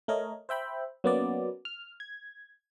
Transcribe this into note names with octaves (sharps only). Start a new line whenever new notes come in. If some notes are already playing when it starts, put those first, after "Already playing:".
A3 A#4 C#5 D#5
C5 E5 G5 B5
F#3 A#3 B3 C#4 D5
F6
G#6